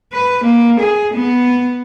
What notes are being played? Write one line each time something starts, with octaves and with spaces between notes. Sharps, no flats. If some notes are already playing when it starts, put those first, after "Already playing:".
B4
A#3
G#4
B3